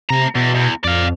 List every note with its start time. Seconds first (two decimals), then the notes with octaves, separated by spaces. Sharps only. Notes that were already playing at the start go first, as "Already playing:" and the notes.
0.10 C3 A3 A#5
0.35 E2 B2
0.55 E2
0.84 F2 D5 F5